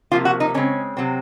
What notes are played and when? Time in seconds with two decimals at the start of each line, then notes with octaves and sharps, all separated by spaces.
0.12 C3 F3 A#3 F4
0.25 F#4
0.40 D#4
0.54 C#3 G#3 C4 C#4
0.97 C3 F#3 C4